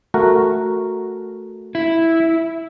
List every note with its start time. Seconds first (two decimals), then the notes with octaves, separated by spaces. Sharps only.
0.14 A3 F#4 A#4
1.75 E4